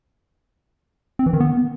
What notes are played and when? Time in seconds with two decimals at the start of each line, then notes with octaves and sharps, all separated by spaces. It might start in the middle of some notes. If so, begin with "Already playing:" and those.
1.19 C4
1.26 E3
1.33 D#3
1.40 B3